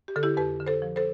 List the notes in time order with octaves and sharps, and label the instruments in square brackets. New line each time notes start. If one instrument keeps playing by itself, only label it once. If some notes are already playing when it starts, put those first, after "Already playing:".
[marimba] G4
D3 A4
E4 G4
F2 G4 B4
D3
A4 C5
F3
A4 C5